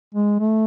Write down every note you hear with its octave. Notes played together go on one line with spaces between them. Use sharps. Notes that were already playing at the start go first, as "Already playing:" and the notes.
G#3
A3